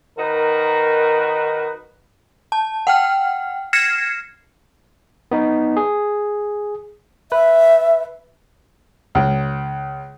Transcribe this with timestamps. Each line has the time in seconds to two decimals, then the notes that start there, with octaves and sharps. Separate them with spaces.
0.17 D#3 D#4 F#4 A#4 B4
2.52 A5
2.87 F#5 G5 F6
3.73 F6 G#6 A#6 C7 C#7 E7
5.31 B3 D#4
5.77 G#4
7.32 B4 E5
9.15 C#2